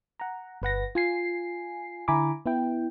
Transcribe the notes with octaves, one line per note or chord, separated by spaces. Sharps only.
F#5 A#5
G1 B4 F#5 A#6
F4 G#5 C7
D3 E4 G#5 A#5 B5 D6
B3 E4 G5